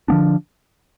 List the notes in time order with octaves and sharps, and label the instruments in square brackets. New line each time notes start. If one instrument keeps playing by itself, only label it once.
[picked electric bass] D3 F3 B3 D4